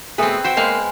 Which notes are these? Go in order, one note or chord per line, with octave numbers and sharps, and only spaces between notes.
B2 A3 C4 G#4 B4
F#4 C5 E5 G5
G#3 A#3 B3 F5